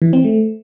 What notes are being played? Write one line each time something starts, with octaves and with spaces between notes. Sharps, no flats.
E3
C4
A3